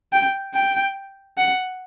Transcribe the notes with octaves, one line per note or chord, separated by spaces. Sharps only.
G5
G5
F#5